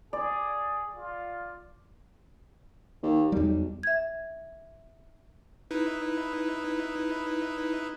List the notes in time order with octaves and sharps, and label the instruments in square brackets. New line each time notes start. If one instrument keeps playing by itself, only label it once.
[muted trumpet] G#4 [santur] D5
[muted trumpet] F4
[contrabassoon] D#2
[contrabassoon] B1 [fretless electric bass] E2 G3
[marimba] E5 G#6
[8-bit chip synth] D#4 E4 B4